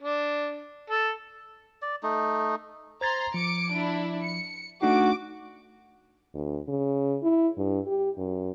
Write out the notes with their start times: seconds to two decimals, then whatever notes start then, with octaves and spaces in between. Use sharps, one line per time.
0.01 D4
0.90 A4
1.82 D5
2.03 A3 D#4
3.01 C5 A#5 C6 G#6 A6
3.34 F3 D6 C#7 D7
3.72 D4 E4
4.22 C#7
4.82 A3 D4 D#4 F#4 D6
6.34 D2
6.68 C#3
7.23 E4
7.57 G2
7.87 G4
8.17 F#2